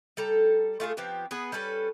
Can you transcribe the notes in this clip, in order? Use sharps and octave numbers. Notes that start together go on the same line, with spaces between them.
G3 A4 A#5
A3 F4 G#4 A4
F3 B3 C4 G4
B3 G#4 B4
G3 C#4 A4 B4